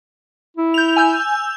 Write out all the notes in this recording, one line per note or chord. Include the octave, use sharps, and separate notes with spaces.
E4
G6 F7
G#5 E6 G6